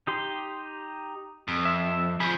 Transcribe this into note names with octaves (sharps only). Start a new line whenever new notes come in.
D#4 G4 C6
F2
E5
F3 G#4 B5